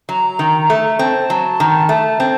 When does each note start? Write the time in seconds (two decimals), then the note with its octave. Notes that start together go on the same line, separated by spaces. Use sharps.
0.09 F#3 A#5
0.39 D#3
0.70 A3
0.99 C4 A5
1.30 F#3
1.60 D#3
1.89 A3
2.20 C4